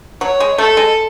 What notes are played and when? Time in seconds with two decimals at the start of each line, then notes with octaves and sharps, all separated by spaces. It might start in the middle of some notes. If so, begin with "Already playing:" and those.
0.21 F#3 C#5
0.40 G#3
0.58 A3 A4
0.77 G#3